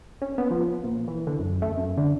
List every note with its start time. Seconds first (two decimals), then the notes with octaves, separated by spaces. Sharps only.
0.22 C#4
0.38 B3
0.51 F3
0.84 A#2
1.08 E3
1.27 D3
1.39 F#2
1.62 A3
1.77 F#2
1.97 D3